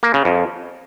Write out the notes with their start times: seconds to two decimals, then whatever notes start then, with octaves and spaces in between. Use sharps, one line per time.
0.03 A#3
0.14 C#3
0.25 F2